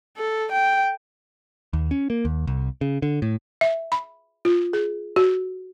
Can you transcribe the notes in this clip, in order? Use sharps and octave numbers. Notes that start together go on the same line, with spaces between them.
A4
G5
D#2
C#4
A#3
D#2
C2
C#3
D3
A2
E5
B5
F4
G#4
F#4